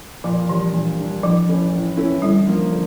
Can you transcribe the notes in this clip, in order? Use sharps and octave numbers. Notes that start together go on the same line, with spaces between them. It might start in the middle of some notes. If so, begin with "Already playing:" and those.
A#2 F3
E3 G3 D4
A#2
G3 D4
A2 F3
E3 A3 C#4 E4
A2
E3 A3 C#4 E4
D3 G3
F3 A#3
D3